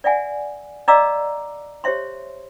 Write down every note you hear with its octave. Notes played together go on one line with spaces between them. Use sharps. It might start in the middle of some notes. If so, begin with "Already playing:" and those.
D5 E5 F#5 G#5
D5 D#5 F5 A#5 D6 E6
G4 C5 C#5 E5 C6